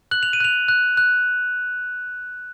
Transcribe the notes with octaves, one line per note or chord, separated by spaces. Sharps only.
F#6 F#7
F7
D#7
F#6 F7
F#6
F#6